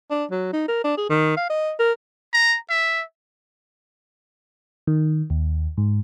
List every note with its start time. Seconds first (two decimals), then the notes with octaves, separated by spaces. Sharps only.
0.10 D4
0.31 F#3
0.53 D#4
0.68 A#4
0.84 D4
0.98 G#4
1.10 D#3
1.37 F5
1.50 D#5
1.79 A#4
2.34 A#5
2.70 E5
4.87 D#3
5.30 D#2
5.78 G#2